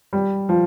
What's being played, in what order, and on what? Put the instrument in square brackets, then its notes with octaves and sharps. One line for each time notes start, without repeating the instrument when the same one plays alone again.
[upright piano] G3
F3